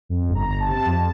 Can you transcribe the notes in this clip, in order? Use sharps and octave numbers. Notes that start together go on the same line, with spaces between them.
F2
G1
A#5
G1
A5
C3
F2